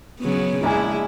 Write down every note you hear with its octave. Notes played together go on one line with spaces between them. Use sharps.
C#3 F#3 B3
A#1 G#3 E4 G#5